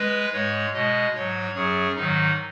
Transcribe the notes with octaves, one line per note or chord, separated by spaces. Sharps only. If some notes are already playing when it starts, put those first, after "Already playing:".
Already playing: G#3 B4
G#2 G#3 C#5
B2 G#3 D#5
G#2 F#3 C#5
F#2 F#3 G#4
G#2 D#3 F#3 D#4